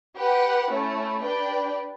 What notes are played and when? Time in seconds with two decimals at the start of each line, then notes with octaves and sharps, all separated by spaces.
0.16 G4 B4 F#5
0.69 A3 C#4 E4
1.21 D4 G4 B4 D5 G5